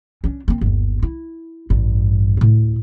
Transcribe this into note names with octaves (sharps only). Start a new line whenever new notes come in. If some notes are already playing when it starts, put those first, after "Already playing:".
C#4 D4
A#3 C4
G1 D#2
E4
A1 G2
D2 A2